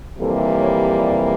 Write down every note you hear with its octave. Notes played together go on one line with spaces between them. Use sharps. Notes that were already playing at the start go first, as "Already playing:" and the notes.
F2 C3 E3 G3 A#3 A4
C#5
D5